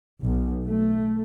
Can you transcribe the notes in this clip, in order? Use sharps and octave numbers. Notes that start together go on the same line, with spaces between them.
B1
A3